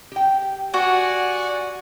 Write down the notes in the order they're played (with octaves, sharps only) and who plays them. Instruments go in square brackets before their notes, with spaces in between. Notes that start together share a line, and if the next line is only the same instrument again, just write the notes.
[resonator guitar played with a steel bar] G4 G5
[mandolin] F#4 [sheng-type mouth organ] D5 F#5 G#5